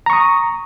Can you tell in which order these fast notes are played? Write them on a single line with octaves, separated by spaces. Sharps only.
A#5 C#6 D#6